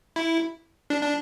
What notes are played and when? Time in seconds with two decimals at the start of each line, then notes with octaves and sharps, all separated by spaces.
0.16 E4
0.90 D4
1.03 D4